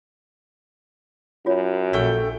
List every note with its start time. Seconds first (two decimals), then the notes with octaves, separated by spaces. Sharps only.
1.46 F#2 F4 C#5
1.93 A#1 A#2 A3 G5